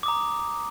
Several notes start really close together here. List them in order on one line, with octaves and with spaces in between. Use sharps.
D6 D#6 A#5